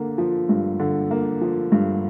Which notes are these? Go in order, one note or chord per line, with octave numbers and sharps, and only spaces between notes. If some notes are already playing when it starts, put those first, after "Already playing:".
Already playing: D3 A#3
F3
G2
D3
A#3
F3
G2